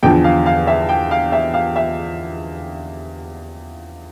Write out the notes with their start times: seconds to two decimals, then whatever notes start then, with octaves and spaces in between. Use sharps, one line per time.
0.03 E2 D3 F3 G5
0.24 F5
0.46 F5
0.67 E5
0.89 G5
1.11 F5
1.32 E5
1.54 F5
1.76 E5